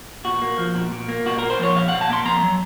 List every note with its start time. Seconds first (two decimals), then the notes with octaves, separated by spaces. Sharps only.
0.25 A#2 F#4
0.42 A#3
0.58 F3
0.75 A#2
0.92 A#2
1.09 A#3
1.26 A#2 F#4
1.38 A#3 A#4
1.50 C5
1.59 F3 C#5
1.75 A#2 F5
1.88 A#2 F#5
2.01 A5
2.10 A#3 C6
2.25 F2 A#5
2.43 F#3